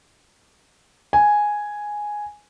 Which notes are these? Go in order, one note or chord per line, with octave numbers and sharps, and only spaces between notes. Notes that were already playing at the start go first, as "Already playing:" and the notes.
G#5